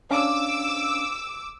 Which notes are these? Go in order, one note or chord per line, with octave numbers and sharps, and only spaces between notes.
C#4 D4 F5 D6 E6